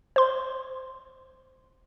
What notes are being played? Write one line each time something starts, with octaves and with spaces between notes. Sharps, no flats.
C5 C6